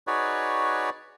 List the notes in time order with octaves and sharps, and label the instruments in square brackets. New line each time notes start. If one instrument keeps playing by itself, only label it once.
[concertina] D#4 F#4 G#4 B4 C#5 D5